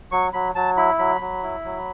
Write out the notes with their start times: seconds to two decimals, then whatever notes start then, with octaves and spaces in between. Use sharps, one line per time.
0.12 F#3 C#6
0.33 F#3 B5
0.55 F#3 A5
0.77 E4 B5
0.99 F#3 B5
1.21 F#3
1.43 E4
1.64 F#3